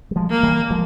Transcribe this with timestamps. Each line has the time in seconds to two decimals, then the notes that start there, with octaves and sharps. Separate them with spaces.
0.11 G3
0.16 F3 G#3
0.30 A#3
0.43 E3 G3
0.70 F3 G#3